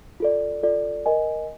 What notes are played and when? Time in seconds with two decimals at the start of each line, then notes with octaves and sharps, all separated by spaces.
0.20 F4 A4 D5
0.63 F4 A4 D5
1.06 A#4 D#5 G#5